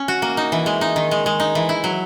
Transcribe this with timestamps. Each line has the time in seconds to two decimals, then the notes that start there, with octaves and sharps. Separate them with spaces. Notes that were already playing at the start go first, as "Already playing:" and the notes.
Already playing: C#4
0.08 F#4
0.22 A#3
0.37 D#4
0.52 E3
0.66 G#3
0.81 D#4
0.96 D#3
1.11 G#3
1.26 G#3
1.40 D#4
1.55 E3
1.69 E4
1.84 F#3